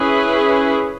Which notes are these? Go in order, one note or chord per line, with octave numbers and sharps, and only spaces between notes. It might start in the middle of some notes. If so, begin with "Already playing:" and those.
Already playing: C#4 E4 G#4 B4